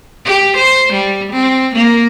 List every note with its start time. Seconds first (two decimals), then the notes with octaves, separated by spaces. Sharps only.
0.25 G4
0.57 C5
0.93 G3
1.32 C4
1.75 A#3